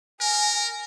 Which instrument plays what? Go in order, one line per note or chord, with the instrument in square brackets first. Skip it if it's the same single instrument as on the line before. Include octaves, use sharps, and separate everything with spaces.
[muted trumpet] A#4 [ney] G#5